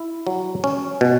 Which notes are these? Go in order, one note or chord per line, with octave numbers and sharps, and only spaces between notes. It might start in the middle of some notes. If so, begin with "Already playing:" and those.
Already playing: E4
F#3
C#4
B2